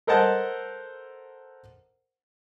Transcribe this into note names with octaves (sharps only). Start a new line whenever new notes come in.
A4 A#4 C5 D#5 F#5 A5